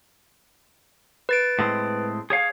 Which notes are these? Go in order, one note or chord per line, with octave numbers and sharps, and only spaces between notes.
B4 A6 D7
A2 G#3 C4
G#4 C#5 F5